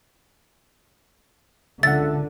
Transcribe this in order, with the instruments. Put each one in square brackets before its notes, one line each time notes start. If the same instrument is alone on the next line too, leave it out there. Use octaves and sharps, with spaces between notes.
[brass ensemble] C#2 A4 [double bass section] D3 [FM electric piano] E5 F#5 [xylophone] A6